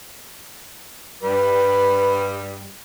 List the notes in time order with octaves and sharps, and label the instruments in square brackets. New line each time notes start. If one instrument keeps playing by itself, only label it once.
[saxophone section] G2 G3 [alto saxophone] B4